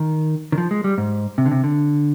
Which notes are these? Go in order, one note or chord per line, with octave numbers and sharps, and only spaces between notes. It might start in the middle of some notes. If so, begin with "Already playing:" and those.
Already playing: D#3
D#3
F3
G#3
G3
G#2
C3
D3
C3
D3